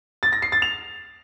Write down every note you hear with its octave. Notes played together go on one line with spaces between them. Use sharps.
A6
A#6
C7
A6
F7